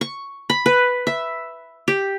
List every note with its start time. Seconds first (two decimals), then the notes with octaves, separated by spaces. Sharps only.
0.01 C#6
0.50 B5
0.66 B4
1.07 E5
1.88 G4